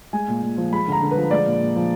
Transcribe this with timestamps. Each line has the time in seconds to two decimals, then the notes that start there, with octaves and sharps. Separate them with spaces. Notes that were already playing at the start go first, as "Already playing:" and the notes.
0.13 G#3 G#5
0.28 A#2
0.42 A#2
0.58 F3
0.72 G#3 B5
0.87 D3 A#5
1.02 D3
1.11 B4
1.17 F3
1.31 G#3 D5
1.46 A#2
1.61 A#2
1.76 F3